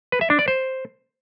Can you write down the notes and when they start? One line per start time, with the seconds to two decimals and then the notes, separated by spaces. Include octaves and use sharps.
0.12 B4
0.21 E5
0.30 D4
0.39 D5
0.48 C5